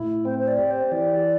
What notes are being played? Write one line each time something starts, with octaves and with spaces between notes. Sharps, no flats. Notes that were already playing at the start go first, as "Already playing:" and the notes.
Already playing: A2 E4
C4 C5
C5
D5
G4
C5
E3 D5